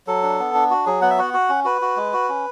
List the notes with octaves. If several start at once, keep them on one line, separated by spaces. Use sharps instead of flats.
F#3 A4
D4
B3
D4
F#4
F#3 G#4
B3 F#5
E5
F#4 F#5
F#4
C#4
F#4 B4
F#4
G#3
F#4
C#4